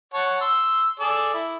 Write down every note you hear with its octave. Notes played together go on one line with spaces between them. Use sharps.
C#5 F#5 A5
C6 E6
G#4 A4 D5
E4